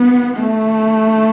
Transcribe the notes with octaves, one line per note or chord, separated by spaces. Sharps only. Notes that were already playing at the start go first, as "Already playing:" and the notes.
Already playing: B3
A3